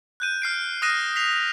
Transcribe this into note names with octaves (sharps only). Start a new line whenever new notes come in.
F#6 G6 D#7
F6 C7 D7
D#6 F6 F#6 A#6 D#7 E7
B6 C7 F7